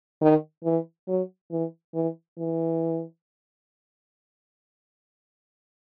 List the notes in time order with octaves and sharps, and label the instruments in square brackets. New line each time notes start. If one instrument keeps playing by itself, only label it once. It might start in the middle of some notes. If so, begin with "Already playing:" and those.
[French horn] D#3
E3
F#3
E3
E3
E3